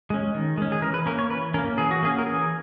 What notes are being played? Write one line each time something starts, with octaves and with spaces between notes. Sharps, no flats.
G#3 C#4
D#3
G#3 C#4
G#4
E3 A#4
B4
A#3 C#4 A#4
C#5
E3 B4
A#3 C#4 A#4
E3 G#4
F#4
A#3 C#4 G#4
A#4
E3 G#4